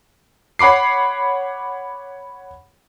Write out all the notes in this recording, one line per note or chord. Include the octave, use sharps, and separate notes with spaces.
C#5 F#5 B5 D6 C7